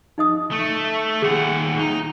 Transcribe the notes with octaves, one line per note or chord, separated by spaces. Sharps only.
D#4 D#5 D#6
A3
D#2 G#4 F#5
D#4 G#5